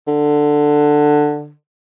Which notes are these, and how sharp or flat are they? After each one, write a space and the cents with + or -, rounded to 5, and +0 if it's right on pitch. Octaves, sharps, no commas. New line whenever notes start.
D3 +10